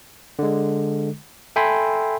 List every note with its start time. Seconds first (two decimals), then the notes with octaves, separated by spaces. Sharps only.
0.39 D3 G#3
1.56 A4 E5 G5 G#5 B5 C6